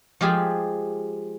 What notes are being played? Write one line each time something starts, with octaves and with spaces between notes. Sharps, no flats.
F3 G#3 F4 G4 G#4